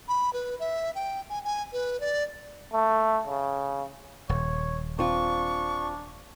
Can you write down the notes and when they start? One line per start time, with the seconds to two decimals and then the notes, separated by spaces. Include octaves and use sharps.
0.08 B5
0.33 B4
0.60 E5
0.95 G5
1.30 G#5
1.45 G#5
1.73 B4
2.00 D5
2.73 A3
3.27 C#3
4.29 D#1 C#5
4.99 C4 D4 F4 C#6